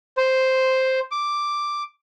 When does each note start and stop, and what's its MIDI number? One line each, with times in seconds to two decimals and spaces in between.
0.17 0.99 72
1.11 1.83 86